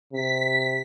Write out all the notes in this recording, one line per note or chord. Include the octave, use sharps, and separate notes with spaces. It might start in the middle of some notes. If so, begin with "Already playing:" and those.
C3 B6